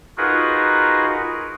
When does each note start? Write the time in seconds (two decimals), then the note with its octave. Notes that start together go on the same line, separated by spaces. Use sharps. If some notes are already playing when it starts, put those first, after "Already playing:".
0.17 D#4 F4 F#4 G#4 A#4 B4